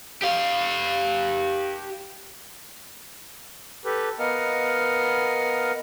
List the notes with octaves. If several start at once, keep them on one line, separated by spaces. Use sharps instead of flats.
G4 F5
G4 A4 B4
B3 A#4 D#5 F5 F#5